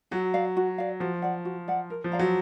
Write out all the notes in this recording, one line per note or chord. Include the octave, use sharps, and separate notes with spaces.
F#3 F#4
D5 F5
F#4
D5 F5
F3 F#4
D5 F#5
F#4
D5 F#5
A#4
F3
D5 F5 A#5
F#3